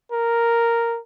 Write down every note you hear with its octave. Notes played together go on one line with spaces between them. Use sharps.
A#4